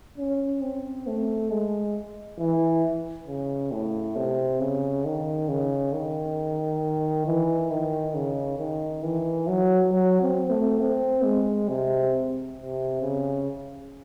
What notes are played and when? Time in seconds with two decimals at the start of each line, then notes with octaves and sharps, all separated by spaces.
0.18 C#4
0.62 C4
1.07 A3
1.51 G#3
2.39 E3
3.27 C#3
3.72 A2
4.16 C3
4.60 C#3
5.05 D#3
5.49 C#3
5.93 D#3
7.26 E3
7.70 D#3
8.15 C#3
8.58 D#3
9.03 E3
9.47 F#3
9.92 F#3
10.21 C4
10.50 A3
10.80 C4
11.24 G#3
11.69 C3
12.57 C3
13.01 C#3